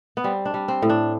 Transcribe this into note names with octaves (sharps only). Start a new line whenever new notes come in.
B3
G3 C4
D4
G3
C4
A2
D4